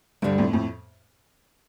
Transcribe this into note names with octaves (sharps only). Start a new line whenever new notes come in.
D2 G2 D3 G3
F2 A2
F2 A2